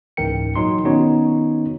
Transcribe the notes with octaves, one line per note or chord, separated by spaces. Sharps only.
C#2 G#2 E3 A#4 G5 C#7
A#2 F#3 D#4 C6
D#3 B3 C#4 D#4 F#4 C#5